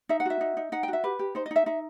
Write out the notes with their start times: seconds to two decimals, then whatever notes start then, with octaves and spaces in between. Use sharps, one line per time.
0.09 D#4 E5
0.20 F#5
0.25 F#4 E5
0.41 D#4
0.57 D#4
0.72 D#4 F#5
0.83 G5
0.88 F#4
0.93 E5
1.04 G4 B4
1.19 G4
1.35 D#4 C5
1.46 D#5
1.51 D#4 E5
1.66 D#4 E5